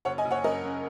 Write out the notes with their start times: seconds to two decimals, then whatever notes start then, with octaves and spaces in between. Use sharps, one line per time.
0.05 F#1 C#5 F#5
0.18 D#5 G#5
0.25 F#1
0.31 C#5 F#5
0.44 F#2 A#4 D#5
0.63 C#3